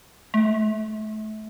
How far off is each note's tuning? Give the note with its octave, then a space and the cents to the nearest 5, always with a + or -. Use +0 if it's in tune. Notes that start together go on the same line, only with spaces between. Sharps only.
A3 -30